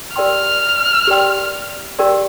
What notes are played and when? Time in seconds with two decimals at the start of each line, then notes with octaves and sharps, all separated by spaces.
0.16 G4 A#4 D5 G5 C6 F6
1.07 G4 A#4 D5 G5 C6
1.99 G4 A#4 D5 G5 C6